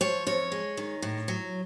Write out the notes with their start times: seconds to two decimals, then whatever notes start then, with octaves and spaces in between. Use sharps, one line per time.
0.01 F3 C#5
0.27 F2 C#5
0.52 G#3
0.77 D#3
1.02 A2
1.28 F#3